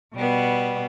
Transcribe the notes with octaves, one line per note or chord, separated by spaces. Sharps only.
B2 G3 B3